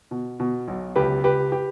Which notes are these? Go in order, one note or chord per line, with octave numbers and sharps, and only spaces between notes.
B2
B2
B1
C#2 G4 B4
C#2 G4 B4
G4 B4